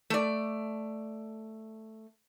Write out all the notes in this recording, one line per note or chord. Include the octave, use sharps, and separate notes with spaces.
A3 D5